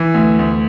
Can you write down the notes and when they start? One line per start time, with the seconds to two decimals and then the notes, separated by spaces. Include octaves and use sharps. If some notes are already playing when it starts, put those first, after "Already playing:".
Already playing: E3
0.14 D2
0.39 D2